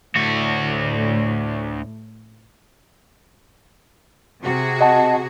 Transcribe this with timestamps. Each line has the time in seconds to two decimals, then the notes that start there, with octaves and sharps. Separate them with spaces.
0.16 D2 A2 F#4
4.43 C3 F#4 G#4
4.81 D#5 F#5 A5